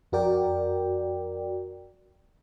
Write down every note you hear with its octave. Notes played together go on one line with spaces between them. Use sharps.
F2 F#4 A#4 D5 G5